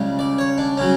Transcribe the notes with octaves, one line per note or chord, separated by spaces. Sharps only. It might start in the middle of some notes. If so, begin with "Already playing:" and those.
Already playing: C#2 C#3 G3
D5
C#5
D4
C#3 F#3 C#4